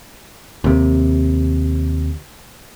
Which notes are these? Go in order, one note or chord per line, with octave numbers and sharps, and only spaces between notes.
D#2 C3